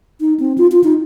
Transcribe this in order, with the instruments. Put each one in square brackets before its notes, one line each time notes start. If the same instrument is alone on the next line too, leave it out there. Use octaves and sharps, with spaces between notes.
[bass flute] D#4
C4
F4
F4
D#4